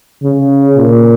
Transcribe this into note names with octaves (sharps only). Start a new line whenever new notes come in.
C#3
A#2